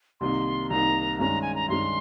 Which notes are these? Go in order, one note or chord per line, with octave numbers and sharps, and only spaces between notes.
C2 C3 D#3 A#3 D#4 C6
C2 C3 D#3 A#3 D#4 A#5
G2 D#3 G#3 C#4 A#5
G#5
A#5
G2 D#3 G#3 C#4 C6